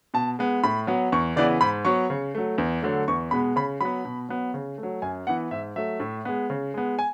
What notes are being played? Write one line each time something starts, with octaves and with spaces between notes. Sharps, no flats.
B2 A5
G#3 B3
A2 B5
F#3 B3
E2 C#6
C#3 E3 B3 D5
G#2 B5
F#3 B3 C#6
C#3
F#3 A3
E2
D3 F#3 A3
E2 C#6
B2 G#3 B3 B5
C#3 B5
F#3 B3 B5
B2
F#3 B3
C#3
A3
F#3
F#2 G#5
E3 B3 F#5
G#2 E5
F#3 A3 E5
A2
G#3 B3
C#3
G#3 B3
G#5